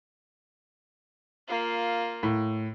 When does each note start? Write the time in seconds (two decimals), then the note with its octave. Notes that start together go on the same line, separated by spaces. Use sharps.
1.48 A#3 F4
2.23 A2